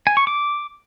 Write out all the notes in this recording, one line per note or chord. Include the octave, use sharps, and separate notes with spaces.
G#5
C#6
D6